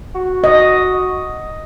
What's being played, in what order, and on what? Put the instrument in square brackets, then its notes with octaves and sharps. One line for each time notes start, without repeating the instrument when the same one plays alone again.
[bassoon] F#4
[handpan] D#5